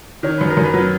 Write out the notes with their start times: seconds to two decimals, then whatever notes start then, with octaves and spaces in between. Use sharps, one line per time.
0.23 D#3 C#5
0.38 F#2 B4
0.50 A#4
0.57 F#2
0.63 B4
0.74 F#3